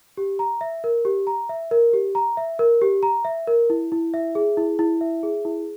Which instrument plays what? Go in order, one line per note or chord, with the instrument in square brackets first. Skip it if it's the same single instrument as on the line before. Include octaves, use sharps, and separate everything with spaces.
[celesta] G4
A#5
E5
A#4
G4
A#5
E5
A#4
G4
A#5
E5
A#4
G4
A#5
E5
A#4
E4
E4
E5
G#4
E4
E4
E5
G#4
E4